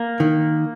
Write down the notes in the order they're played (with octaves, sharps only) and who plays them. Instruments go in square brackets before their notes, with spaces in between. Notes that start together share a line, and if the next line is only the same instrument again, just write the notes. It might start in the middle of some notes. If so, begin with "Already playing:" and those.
Already playing: [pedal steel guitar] A#3
[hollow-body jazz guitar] D#3